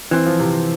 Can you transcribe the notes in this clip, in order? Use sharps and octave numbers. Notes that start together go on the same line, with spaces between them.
E3 C4
F3
C3